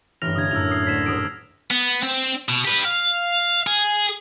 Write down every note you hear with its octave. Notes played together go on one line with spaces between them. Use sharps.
A1 G2 F6 A#6 F7
D3 A#3 D4 D#6 G#6
F#2 A2 E6 F7
D#6 C7
D2 D5 B6 E7
D#1 D6 D#6 G#6 D7
B3
C4
B2
G4 B4
F5
G#4